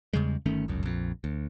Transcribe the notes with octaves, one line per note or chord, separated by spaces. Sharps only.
E2 C#3 G3 G#3
G1 D#3 A3 C#4
G1 C#2 F#2
A#1 F2
D2